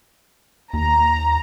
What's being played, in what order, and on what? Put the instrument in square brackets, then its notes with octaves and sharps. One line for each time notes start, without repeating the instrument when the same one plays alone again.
[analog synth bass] D#2 [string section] A#5